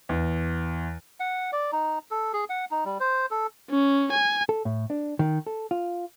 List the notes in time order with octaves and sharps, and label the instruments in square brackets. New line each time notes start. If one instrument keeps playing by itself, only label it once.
[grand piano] E2
[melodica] F#5
D5
D#4
A4
G#4
F#5
D#4
G3
C5
A4
[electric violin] C#4
G#5
[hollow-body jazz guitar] A4
A2
D4
D#3
A4
F4